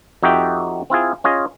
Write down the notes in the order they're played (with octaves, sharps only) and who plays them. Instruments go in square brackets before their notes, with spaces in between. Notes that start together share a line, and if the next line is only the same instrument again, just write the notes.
[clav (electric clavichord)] F2 D#4 F#4 G4 E5 G5
C4 E4 F4 G#4
C#4 F4 G#4 D#5